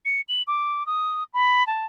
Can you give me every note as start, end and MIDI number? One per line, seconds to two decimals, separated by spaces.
0.05 0.21 97
0.28 0.42 102
0.47 0.86 86
0.86 1.24 87
1.34 1.66 83
1.67 1.86 81